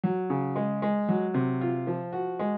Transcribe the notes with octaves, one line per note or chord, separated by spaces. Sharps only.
F#3
C#3
G#3
G#3
F#3
C3
F4
F3
F#4
G#3